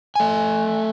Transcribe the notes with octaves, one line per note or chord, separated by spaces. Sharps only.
A3 G#5